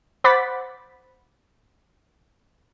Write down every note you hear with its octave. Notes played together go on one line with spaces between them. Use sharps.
C5 F#5 B5 D6 A6 B6